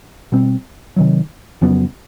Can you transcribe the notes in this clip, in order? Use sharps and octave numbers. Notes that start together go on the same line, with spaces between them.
B2 G3 C4
C3 D#3 F#3
F2 C#3 F#3 B3